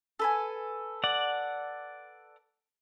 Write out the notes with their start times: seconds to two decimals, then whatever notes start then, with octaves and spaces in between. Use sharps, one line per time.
0.19 A4 B4 G#5
1.04 D5 F#5